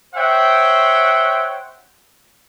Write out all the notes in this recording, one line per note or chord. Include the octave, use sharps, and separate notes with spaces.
C5 C#5 E5 F#5 G5